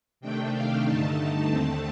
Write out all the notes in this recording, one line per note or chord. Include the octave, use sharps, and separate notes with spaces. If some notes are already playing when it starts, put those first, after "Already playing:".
C3 D#3 A3 D4 G5
F5
G2 D3 A3 D#4 A5
D#2 D3 A3 C4